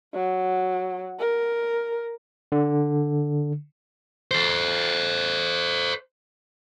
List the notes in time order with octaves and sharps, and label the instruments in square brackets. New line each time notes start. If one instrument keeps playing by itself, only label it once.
[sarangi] F#3
A#4
[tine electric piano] D3
[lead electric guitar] A4 C5